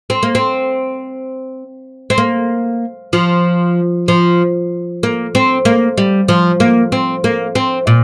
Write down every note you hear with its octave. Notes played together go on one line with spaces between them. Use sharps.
C4
A#3
C4
C4
A#3
F3
F3
A#3
C4
A#3
G3
F3
A#3
C4
A#3
C4
A#2